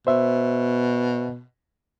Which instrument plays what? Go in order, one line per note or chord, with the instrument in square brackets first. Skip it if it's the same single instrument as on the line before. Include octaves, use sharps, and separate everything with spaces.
[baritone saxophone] B2 [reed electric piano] C5 E5